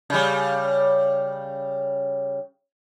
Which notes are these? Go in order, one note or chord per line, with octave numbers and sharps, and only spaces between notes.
C#3 G3